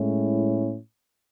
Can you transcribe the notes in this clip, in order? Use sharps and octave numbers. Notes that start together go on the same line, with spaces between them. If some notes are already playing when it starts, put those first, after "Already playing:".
Already playing: A2 G#3 C#4 E4